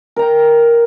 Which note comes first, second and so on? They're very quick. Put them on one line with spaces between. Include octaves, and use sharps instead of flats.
A#4 A#5 G5